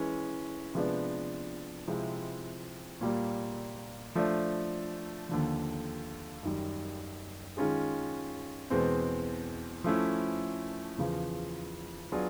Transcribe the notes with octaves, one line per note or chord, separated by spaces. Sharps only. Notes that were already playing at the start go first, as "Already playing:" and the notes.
Already playing: E3 G#3 C#4
C3 F3 G#3 B3 D4
C3 F3 G#3 C4 E4
A#2 G3 A#3
F3 A3 D4
D#2 D3 F3
F#2 D#3 G3
D#3 G#3 C#4 F4 G#4
E2 B2 G#3 C4
F3 A3 C#4 E4
E2 C#3 F3
F#3 B3 D4 F4 G#4